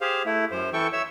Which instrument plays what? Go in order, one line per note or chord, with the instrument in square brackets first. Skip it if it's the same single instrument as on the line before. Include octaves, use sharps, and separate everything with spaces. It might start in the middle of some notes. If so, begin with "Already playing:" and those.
[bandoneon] G4 G#4 C5 F5
A3 E4
F#2 C5
E3 A4 G5 C#6
C#5 E5 E6